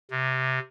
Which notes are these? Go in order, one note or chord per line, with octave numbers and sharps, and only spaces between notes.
C3